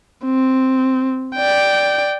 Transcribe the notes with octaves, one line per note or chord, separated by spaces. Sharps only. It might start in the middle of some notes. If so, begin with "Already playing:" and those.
C4
D5 G5